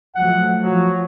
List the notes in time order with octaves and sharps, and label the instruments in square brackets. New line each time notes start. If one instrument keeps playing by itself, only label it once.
[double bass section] F3 F#3 A3 [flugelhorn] F#5
[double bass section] F3 [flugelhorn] F#3